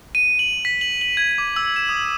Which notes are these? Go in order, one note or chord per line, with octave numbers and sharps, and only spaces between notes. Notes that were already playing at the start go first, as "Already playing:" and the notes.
D#7
F#7
B6
F#7
F#7
G#6
D6
E6
E7
D#6